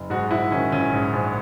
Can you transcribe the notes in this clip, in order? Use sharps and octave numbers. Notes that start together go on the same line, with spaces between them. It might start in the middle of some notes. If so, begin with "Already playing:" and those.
Already playing: F#1
G#2 F#4
A#1 E4
D#3 C#4
A#1 C#4
G#2
A#1